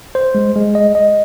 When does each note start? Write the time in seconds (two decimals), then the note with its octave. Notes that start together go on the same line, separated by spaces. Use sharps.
0.15 C5
0.35 G#3
0.56 G#3
0.75 D#5
0.95 D#5